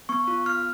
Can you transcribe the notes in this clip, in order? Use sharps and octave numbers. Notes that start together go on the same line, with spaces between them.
B3 C#6
F4
B3 F6